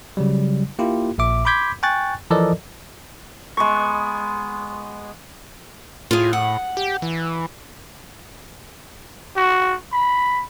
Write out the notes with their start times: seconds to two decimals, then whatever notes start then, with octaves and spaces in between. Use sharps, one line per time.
0.17 C#3 F#3 G3
0.79 A#3 E4 F4 G4
1.18 A#1 A#2 E5 D6
1.45 B5 C6 D6 G6 G#6 B6
1.83 G5 G#5 C#6 F#6 A6
2.31 E3 F3 A4 A#4 D5 D#5
3.57 G#3 B3 C#6
6.11 A2 F4 G#4
6.33 F#5
6.77 G4
7.02 E3
9.36 F#4
9.92 B5